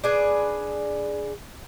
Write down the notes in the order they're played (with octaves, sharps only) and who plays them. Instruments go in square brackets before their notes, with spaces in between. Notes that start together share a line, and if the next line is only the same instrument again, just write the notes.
[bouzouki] D4 G#4 B4